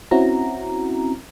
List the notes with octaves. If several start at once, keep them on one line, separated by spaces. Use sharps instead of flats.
C4 C#4 E4 F#4 A#5